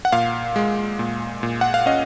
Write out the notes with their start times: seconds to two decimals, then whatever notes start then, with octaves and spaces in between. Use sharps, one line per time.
0.05 F#5
0.12 A#2 F5
0.56 G#3
0.99 A#2
1.43 A#2
1.61 F#5
1.74 F5
1.86 C#4 D#5